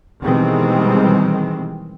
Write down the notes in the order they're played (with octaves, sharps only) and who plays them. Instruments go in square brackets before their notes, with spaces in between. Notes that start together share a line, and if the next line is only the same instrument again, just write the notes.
[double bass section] B2 D#3 E3 G3 G#3 C4